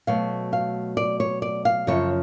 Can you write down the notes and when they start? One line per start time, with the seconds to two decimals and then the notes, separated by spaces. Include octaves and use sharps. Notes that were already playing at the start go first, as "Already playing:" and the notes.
0.07 B2 F#3 A3 F5
0.53 F5
0.97 D5
1.20 C#5
1.42 D5
1.65 F5
1.87 F#2 C#3 F3 C#5